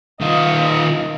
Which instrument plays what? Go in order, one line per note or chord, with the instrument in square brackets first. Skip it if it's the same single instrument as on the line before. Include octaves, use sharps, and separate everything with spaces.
[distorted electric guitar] D#3 F4 [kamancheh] D#5 F5